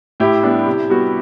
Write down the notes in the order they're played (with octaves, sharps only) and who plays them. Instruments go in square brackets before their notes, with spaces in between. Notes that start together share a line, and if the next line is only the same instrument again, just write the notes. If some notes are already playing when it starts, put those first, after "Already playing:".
[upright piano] A2 [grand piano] E4 G4
[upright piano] G3 B3 D4
C3
G3 B3 F#4